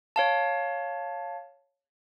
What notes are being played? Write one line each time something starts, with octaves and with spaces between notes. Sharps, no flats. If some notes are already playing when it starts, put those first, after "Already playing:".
C#5 F5 A5